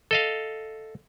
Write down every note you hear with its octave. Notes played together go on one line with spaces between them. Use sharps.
A4 D#5 F5